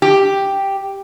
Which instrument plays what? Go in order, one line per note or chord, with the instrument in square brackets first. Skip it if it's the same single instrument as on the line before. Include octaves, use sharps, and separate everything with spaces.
[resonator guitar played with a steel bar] G4